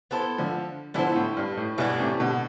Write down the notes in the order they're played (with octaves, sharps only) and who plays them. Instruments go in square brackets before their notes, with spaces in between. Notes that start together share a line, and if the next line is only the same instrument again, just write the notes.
[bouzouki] B3 E4 A4 C5
[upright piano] D3 F3
[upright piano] D3 F3 [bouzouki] B3 E4 A4 C5
[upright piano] A2
G2
A2
[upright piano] G2 B2 [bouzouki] E3 A3 D4
[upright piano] A2 C3
B2 D3